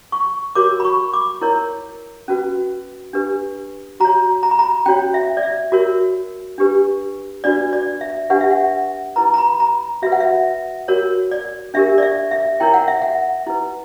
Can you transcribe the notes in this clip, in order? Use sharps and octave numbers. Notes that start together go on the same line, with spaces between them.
C#6
F#4 A#4 C#5 D6
B5
C#6
D6
E4 A#4 C#5
C#4 F#4 B4
D4 G4 B4
F#4 C#5 A#5
A#5
B5
A#5
C#4 F#4 C#5 G5
E5
D5
E5
F#4 A#4 C#5
D4 G4 B4
D4 F#4 B4 D5
D5
E5
D4 G4 B4 F#5
E5
F#5
E4 B4 A#5
A#5
B5
A#5
F#4 B4 E5
F#5
E5
F#4 A#4 C#5
D5
D4 G4 A#4 E5
D5
E5
E5
E4 A#4 C#5 G5
F#5
E5
F#5
E4 B4